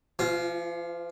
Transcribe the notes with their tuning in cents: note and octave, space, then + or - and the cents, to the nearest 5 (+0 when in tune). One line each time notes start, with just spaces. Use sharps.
F3 -45 F4 +0